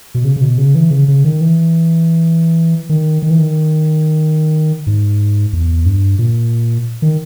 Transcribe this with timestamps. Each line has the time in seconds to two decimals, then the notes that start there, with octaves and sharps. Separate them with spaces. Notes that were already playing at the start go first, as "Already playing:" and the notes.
0.15 B2
0.25 C#3
0.36 C#3
0.41 B2
0.58 C#3
0.75 E3
0.91 C#3
1.08 C#3
1.24 D#3
1.41 E3
2.89 D#3
3.22 D#3
3.30 E3
3.38 D#3
4.87 G#2
5.53 E2
5.86 G2
6.19 A#2
7.02 D#3